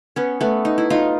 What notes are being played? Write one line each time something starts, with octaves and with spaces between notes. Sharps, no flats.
B3 C#4
A3 B3
D#4
E4
D#4 F4